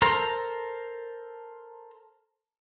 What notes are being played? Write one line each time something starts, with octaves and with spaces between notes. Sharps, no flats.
A4 A#4 C5 A#5